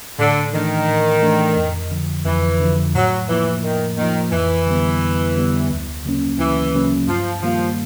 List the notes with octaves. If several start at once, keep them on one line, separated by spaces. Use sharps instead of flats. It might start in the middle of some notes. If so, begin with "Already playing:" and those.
A2 D3
D#3 E3 A3 D4
A2
E3 A3 D4
F2
D3 F3
F2 E3
D3 F3
A2 F#3
E3 F3 A#3
A2 D#3
D#3 F3 A#3
F2 E3
D3 G3 B3
F2
D3 G3 B3
D2
C#3 F#3 A#3 C#4
D2 E3
C#3 F#3 A#3 C#4
G2 F3
D#3 F3 G3 A#3